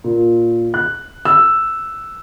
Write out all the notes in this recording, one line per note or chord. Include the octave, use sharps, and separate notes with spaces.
A#2
F#6
E6